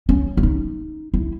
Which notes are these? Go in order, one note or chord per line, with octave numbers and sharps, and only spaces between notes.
C#4
E4
D#4
E4